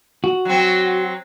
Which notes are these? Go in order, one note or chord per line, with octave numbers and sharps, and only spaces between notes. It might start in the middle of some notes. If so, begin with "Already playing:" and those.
F#4
F#3 C4